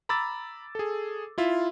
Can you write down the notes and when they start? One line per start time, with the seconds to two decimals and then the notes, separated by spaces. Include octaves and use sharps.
0.09 A#5 B5 D6 E6 A6
0.75 G#4 A4
1.38 E4 F4 E5